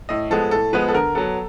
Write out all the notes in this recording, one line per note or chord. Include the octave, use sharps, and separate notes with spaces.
A2 D#5
F3 G#3 B3 A4
A2 A4
F3 G#3 B3 B4
A4
D3 A#4
F#3 B3 A4